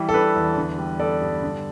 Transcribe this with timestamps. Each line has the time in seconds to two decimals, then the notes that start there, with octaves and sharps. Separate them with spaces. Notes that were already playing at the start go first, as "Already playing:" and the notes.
Already playing: E3 G3
0.09 A4
0.14 D4 B4
0.36 E2
0.56 D3
0.78 G3
0.99 B3 A4 D5
1.21 G2
1.43 D3